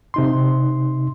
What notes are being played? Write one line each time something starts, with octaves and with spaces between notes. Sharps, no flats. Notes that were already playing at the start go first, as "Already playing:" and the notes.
C3 D#4 C6